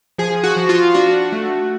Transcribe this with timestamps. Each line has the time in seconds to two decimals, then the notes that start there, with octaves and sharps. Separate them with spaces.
0.18 F3 G#4
0.44 F#4
0.56 F3
0.69 F4
0.94 D4 F#4
1.32 A3